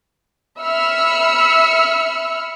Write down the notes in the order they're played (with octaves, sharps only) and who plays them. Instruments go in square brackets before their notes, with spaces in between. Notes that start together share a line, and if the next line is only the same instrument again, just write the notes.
[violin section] E5 B5 E6 F6 C#7